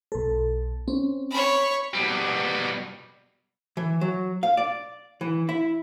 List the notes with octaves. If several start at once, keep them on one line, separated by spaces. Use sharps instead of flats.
B1 A4
C4 C#4
C#5 B5
B2 G3
E3
F#3
F5
D5
E3
E4